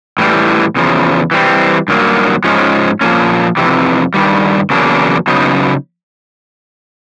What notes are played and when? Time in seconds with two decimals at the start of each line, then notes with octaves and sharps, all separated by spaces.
0.18 A2 E3 G3
0.76 E2 C#3 F3
1.31 E3 G3 C4
1.88 G2 D#3 F#3 A#3
2.44 G#2 F3 G#3 C#4
3.01 A#2 F3 A#3 C#4
3.57 F2 C3 E3
4.14 G2 D#3 G3
4.70 E2 C#3 F#3 A#3 D4
5.28 C#3 F#3 B3 D#4